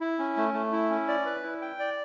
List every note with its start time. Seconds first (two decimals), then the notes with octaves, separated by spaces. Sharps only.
0.01 E4
0.19 C#4
0.37 A3
0.54 A3
0.72 E4
0.90 C#4
1.08 D5
1.26 B4
1.43 E4
1.62 G5
1.79 D5